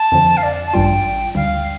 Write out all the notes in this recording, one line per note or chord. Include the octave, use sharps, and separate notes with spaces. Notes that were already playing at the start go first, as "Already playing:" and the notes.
Already playing: A5
F2 D3 F3
F5
D5
A5
A1 G2 G3 F4 G5
D2 D3 G3 F5